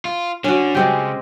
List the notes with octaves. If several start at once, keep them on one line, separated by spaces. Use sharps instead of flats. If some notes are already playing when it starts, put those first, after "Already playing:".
F4
D3 C#4 F#4
C#3 G#3 C4 G4